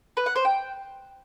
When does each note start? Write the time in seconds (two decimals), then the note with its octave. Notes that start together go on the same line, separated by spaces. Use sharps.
0.17 B4
0.26 F#5
0.35 C5
0.45 G5